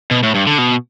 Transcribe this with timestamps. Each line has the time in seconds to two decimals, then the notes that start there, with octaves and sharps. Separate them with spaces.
0.11 B2
0.23 A2
0.35 G2
0.47 D3
0.58 B2